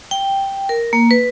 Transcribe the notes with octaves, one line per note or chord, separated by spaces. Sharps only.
G5
A#4
A#3
B4